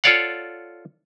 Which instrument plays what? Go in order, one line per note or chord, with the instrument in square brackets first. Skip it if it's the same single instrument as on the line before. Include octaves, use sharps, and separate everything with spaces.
[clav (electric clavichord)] F4 A4 C#5 D5 F5 F#5